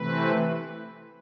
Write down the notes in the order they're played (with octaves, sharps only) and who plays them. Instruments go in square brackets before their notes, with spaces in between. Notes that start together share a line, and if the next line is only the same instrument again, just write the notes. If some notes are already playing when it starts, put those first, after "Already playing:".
Already playing: [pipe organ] C3 E3 A3 C4 B4